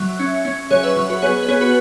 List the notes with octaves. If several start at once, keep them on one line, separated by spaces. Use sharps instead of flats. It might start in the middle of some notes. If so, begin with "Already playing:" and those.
Already playing: F#3 E5
C#4
C#4
F#3 G#4 C#5
B4 E5
F#3
F#4 B4
B3 G#4 C#5
B4
B3 G#4 C#5
F#4 B4